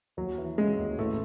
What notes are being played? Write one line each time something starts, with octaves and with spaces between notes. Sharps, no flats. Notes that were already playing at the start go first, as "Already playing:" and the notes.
D#2 F#3
E3
C#3 G#3
D#2
A1 A3